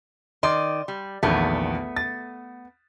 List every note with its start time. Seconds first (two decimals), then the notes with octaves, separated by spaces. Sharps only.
0.43 D#3 D5 D#5 C6
0.88 G3
1.23 A#1 E2 D#3 A3 B3
1.96 A6